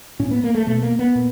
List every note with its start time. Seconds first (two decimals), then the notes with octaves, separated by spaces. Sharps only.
0.19 A2 C#4
0.31 B3
0.44 A#3
0.55 A3
0.67 B2 A3
0.82 A#3
0.99 B3
1.15 A#2